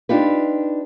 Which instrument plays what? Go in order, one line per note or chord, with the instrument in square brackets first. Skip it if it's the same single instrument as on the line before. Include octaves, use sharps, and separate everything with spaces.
[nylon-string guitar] D4 D#4 F4 G4 B4